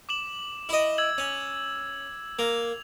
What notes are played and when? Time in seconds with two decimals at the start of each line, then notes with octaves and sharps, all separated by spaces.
0.09 D6 E7 F#7
0.69 E4 D#5
0.98 E6 G#6 F#7
1.18 C#4
2.39 A#3 F7